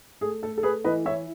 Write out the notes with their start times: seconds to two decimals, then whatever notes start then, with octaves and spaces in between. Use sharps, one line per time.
0.21 A3 G#4
0.43 A3 A4
0.58 A4
0.63 A3 G#4 B4
0.84 E3 B4 D#5
1.05 E4 C#5 E5